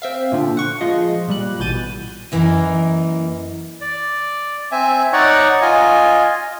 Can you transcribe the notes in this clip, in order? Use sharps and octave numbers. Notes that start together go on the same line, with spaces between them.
C4 E5 F5
A#2 D3 F3
F#5 C#6
F3 G#3 F4 D#5
A#2 G3 F#6
A1 B2 E3 G6 A6 D#7
F#2 E3 A#3 D#4
D5
C4 E5 G#5
D#4 C#5 D5 F#5 A#5 C#6
F4 D#5 G#5